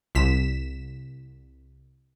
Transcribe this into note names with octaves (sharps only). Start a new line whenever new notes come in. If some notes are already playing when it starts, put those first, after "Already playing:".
C2 B6 E7